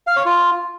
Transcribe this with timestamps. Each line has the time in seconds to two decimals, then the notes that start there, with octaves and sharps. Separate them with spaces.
0.07 F5
0.16 C#5
0.26 F4